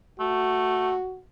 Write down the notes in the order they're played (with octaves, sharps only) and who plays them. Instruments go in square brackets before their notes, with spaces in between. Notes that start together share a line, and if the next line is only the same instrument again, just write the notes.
[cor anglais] A3 [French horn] F#4